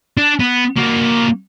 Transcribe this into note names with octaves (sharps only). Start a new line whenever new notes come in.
D4
B3
A#3 F#4